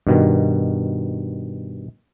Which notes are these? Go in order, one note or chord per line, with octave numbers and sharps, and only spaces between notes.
G2 B2 D#3